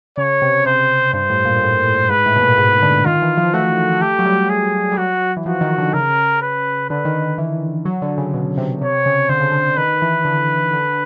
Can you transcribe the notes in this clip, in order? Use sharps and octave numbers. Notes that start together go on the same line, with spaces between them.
C#3 C#5
C3
C3 C5
G2 C5
A2
A#2
A#2
A2
A2
G#2 B4
A2
B2
A#2
G#2
D3
D#3 F4
E3
F3
A3 F#4
A3 G4
F#3
G3
G#4
G3
F#3 F#4
E3
F3 F#4
D#3
D3
C#3 A#4
B4
D3 B4
D#3
D#3
E3
F#3
D3
C#3
B2
C3
C3 C#5
C#3
D3 C5
C#3
D3
D#3 B4
E3
D3
D3